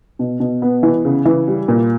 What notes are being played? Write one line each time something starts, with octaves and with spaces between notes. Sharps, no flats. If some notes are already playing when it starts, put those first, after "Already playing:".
B2
B2
B3
E3
C#3
E3
G3
A#2